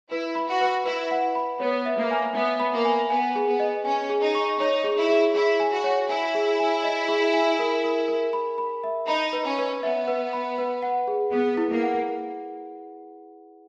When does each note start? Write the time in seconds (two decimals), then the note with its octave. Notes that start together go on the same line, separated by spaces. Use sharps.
0.11 E4 B4
0.35 B5
0.48 F#4
0.61 B4
0.86 E4 B4
1.11 F#5
1.35 B5
1.60 B3 C#5
1.86 E5
1.98 A#3
2.11 G#5
2.35 B3 E5
2.60 B5
2.73 A#3
2.85 G#5
3.10 B3 G#5
3.36 G#4
3.47 B3
3.60 D#5
3.85 C#4 G#5
4.09 G#4
4.22 D#4
4.35 C#6
4.60 D#4 C#5
4.84 G#4
4.97 E4
5.09 G#4
5.34 E4 G#4
5.60 G#5
5.72 F#4
5.84 C#5
6.09 E4 G#5
6.35 G#4
6.59 G#5
6.84 D#5
7.08 G#4
7.33 G#5
7.59 A#4
7.84 A#4
8.08 A#4
8.33 B5
8.58 B5
8.84 E5
9.08 D#4 B5
9.33 B4
9.45 C#4
9.59 B4
9.83 B3 E5
10.08 B4
10.33 B5
10.58 B4
10.82 F#5
11.08 G#4
11.32 B3 G#4
11.57 E4
11.70 A#3
11.83 F#5